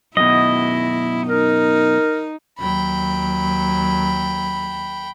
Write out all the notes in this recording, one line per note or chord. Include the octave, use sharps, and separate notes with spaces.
F#2 B2 E4 D#5
D#4 A#4
D#2 F#3 G5 B5